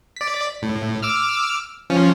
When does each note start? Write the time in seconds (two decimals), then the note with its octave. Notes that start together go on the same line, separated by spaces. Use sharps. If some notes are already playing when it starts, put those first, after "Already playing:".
0.16 D5 B6
0.62 A2
1.02 D6 E6 F6
1.90 F3 C#4